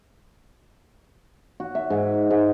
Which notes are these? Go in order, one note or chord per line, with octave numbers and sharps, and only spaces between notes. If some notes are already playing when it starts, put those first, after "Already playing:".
F#4
E5
G#2
G#2